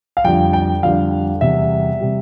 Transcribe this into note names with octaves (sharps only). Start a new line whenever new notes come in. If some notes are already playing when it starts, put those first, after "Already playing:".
F5
F2 D3 G3 G5
G5
F2 D3 G3 F5
E2 C3 G3 E5
C3 G3